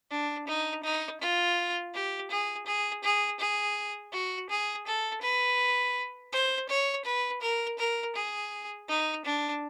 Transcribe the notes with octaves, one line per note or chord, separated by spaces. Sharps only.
D4
D#4
D#4
F4
G4
G#4
G#4
G#4
G#4
F#4
G#4
A4
B4
C5
C#5
B4
A#4
A#4
G#4
D#4
D4